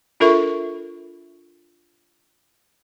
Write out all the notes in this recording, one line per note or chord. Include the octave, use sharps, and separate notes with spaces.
D4 F4 A4 A#4 E5 C#6